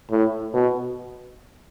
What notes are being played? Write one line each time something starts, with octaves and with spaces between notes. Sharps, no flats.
A2
B2